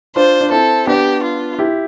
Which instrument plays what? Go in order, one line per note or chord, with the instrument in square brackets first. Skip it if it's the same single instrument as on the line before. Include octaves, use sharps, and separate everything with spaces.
[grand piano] D4 F4 [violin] C5
[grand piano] D4
[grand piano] C4 E4 [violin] A4
[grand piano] B3 D4 [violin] G4
[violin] F4
[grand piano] E4 G4